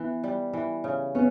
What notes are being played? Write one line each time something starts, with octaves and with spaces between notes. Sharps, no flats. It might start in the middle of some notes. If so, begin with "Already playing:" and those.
Already playing: E3 B3
G3
E3
C#3
B3 C#4